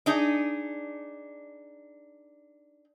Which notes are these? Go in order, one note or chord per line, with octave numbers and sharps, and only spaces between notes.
D4 D#4 G#4